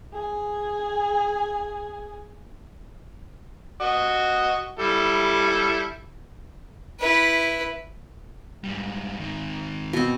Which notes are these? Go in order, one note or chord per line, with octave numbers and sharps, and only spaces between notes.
G#4 G#5
F#4 D#5
G3 E4 A4
E4 B4
G#2 G3
G#2 D#3
B2 C4